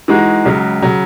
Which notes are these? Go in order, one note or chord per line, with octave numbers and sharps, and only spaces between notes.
E3 G#3 D#4 F#4
C#2 C#3 F#3
C#3 F#3